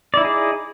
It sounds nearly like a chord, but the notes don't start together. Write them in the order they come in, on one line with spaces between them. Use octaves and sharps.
D5 E4 D#4 G#4